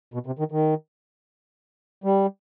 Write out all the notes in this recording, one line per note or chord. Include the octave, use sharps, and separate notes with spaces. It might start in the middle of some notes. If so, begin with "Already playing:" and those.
B2
C3
D#3
D#3
G3